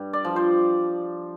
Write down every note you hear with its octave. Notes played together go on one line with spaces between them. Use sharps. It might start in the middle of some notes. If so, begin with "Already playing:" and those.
Already playing: G2
D5
F3
C5